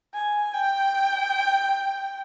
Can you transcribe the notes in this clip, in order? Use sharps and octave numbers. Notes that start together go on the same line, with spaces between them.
G#5
G5